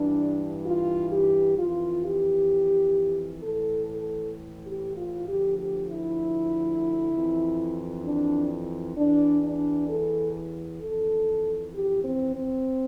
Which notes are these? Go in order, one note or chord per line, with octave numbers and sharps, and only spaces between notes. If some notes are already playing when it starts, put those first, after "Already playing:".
Already playing: G2 E3 D4
F4
G4
F2 E3 F4
G4
A2 E3 A4
A4
G4
F4
D2 D3 F3 G4
G4
E4
F2 E3
D4
E2 E3 D4
D4
A4
F2 E3 A4
G4
C4
C4